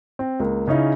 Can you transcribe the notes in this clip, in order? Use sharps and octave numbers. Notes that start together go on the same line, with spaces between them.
C4
C#2 A#3
C#3 C#4 D#4 E4